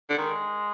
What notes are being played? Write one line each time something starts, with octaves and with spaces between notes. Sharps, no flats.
D3
D#3 G#3